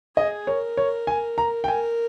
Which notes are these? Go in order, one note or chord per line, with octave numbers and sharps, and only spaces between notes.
G#4 D#5
A#4 C#5
C#5
G#5
A#5
G5
A#4 G#5